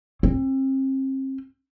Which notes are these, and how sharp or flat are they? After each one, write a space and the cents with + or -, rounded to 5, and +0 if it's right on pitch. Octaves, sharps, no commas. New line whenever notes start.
C4 +35